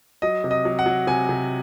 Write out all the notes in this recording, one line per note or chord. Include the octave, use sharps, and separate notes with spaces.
F#3 D#5
C3
D#5
F#3
F#5
F#3
C3 G#5
C3